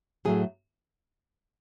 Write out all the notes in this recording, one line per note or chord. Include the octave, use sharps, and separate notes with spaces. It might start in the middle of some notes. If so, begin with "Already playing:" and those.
A2 F#3 A3 G#4